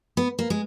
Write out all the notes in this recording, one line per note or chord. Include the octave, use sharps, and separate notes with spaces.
B3
A#3
G#3